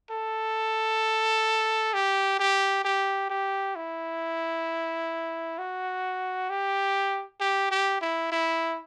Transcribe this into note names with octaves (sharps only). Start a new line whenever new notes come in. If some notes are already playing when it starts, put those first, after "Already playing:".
A4
G4
G4
G4
G4
E4
F#4
G4
G4
G4
E4
E4